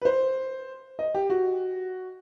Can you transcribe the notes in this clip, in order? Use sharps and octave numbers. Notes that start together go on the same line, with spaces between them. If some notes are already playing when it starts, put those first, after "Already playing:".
B4
C5
D#5
G4
F#4